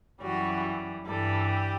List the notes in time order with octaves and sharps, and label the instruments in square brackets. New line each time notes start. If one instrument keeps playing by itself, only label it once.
[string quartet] F#2 E3 G3 F#4
G2 E3 G3 A4
G4